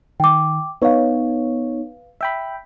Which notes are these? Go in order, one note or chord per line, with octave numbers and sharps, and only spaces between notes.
D#3 G5 D6
B3 D#4 B4 C#5 F5
E5 G5 B5